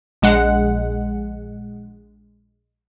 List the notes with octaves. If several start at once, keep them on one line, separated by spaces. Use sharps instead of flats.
A#1 G#3 F#5